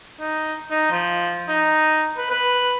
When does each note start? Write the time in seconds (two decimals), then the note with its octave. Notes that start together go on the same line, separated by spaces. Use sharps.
0.20 D#4
0.71 D#4
0.91 F3
1.48 D#4
2.17 B4
2.30 B4